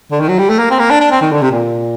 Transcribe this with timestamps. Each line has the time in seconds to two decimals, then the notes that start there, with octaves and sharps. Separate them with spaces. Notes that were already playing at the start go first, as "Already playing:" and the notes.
0.11 D3
0.20 D#3
0.28 F#3
0.39 G3
0.50 A3
0.59 A#3
0.70 C4
0.79 A#3
0.90 D4
1.01 D4
1.11 C4
1.21 D#3
1.32 D3
1.41 C3
1.51 A#2